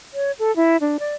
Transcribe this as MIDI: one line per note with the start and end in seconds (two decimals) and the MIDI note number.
0.14 0.32 73
0.39 0.54 69
0.56 0.77 64
0.81 0.97 62
0.99 1.15 74